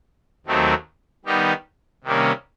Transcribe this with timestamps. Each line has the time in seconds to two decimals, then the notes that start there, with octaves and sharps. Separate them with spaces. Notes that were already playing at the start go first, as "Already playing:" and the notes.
0.46 D#2 D#3 F#3 A3 C4
1.25 D#3 G3 B3 D#4 G4
2.04 C3 D#3 G3 A#3 C#4